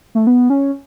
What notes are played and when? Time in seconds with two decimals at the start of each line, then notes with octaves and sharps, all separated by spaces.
0.15 A3
0.27 B3
0.50 C#4